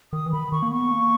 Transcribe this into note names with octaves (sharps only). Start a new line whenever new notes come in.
D#3 D#6
E3
D#3 B5
D#3 C#6
A#3
B3 C#6
A#3